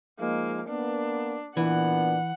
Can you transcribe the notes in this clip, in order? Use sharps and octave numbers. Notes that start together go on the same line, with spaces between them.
F3 G#3 A#3 D#4
A#3 B3 D4
A#2 E3 B3 D4 F#5